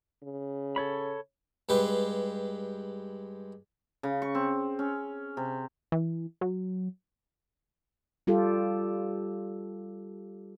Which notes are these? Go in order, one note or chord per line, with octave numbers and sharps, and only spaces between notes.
C#3
A4 C#5 B5
G2 G#3 G4 B4
C#3
C#6
C4
C#4
C3
E3
F#3
G3 F4 G4 A4